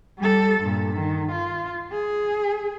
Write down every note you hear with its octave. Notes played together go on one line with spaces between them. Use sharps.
G3 A4
G2 A#2
D#3
F4
G#4